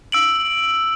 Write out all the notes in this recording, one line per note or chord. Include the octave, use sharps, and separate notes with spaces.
E6 D7 F#7